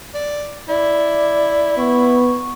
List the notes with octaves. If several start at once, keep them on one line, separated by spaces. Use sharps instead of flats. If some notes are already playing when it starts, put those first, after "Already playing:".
D5
E4 D5
B3 C#6